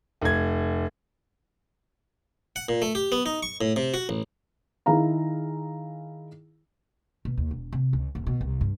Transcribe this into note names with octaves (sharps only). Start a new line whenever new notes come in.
F1 G#6
F#5
A#2
A3
G4
B3
D#4
C#6
A2
C3
F#4
A1
D#3 E4 G#4 F5 A#5
B2
D#2
E1
C3
C#2
D#1
B2
C2
G2